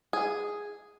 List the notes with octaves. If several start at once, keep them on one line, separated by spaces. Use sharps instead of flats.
G#4